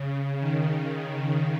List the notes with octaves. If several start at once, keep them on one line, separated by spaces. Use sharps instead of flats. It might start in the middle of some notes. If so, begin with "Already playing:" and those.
Already playing: C#3
D#3
D#3